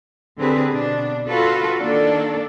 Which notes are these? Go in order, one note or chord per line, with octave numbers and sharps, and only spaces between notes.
D3 C4 G4 G#4 B4
B2 D4
F4 F#4 A4 B4
D#3 A#3 D4 A4 D5